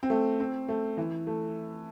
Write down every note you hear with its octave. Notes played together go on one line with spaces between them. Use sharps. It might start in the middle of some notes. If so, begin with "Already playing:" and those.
C4
A3
C4
A3
E3
A3